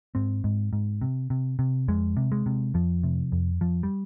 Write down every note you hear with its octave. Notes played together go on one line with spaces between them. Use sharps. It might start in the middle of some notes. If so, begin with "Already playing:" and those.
G#2 C4
G#2
G#2
C3
C3
C3
F2 G#3
C3
G#3
C3
F2 F3
C3
F2
F2 F3
G3